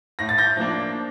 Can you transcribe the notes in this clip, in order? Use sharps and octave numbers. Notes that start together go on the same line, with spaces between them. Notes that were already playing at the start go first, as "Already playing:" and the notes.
A2 A#6
A6
G6 A#6
F3 A#3 D4